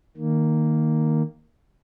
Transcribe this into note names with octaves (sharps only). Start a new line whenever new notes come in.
D#3 A#3